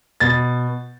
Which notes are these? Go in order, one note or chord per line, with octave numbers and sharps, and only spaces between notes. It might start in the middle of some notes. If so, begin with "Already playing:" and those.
B2 A6